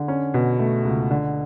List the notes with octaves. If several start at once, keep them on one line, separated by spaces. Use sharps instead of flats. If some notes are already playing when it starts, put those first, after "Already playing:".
Already playing: D3
C#4
B2
A3
C#2
D3